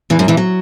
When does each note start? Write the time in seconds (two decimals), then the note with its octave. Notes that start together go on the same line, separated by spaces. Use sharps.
0.10 E2 E3
0.19 F#2 F#3
0.28 E2 E3
0.37 F#3